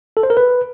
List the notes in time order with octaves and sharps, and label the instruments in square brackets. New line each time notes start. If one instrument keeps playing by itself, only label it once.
[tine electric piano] A4
C5
A#4
B4